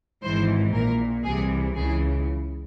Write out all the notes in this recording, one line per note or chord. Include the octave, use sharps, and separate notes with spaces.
G#1 G#2 E3 C5
A#1 A#2 A#4
C2 C3 E3 G#4
C#2 C#3 E3 G#4